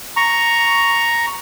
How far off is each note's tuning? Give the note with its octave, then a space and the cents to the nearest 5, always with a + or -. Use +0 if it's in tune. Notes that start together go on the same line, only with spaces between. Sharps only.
A#5 +0 C#6 +0